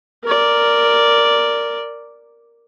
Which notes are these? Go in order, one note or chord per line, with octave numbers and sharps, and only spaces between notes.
A#4 D5